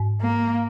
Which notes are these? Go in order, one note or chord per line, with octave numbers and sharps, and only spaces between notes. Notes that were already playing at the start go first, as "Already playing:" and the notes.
Already playing: G#2
A#3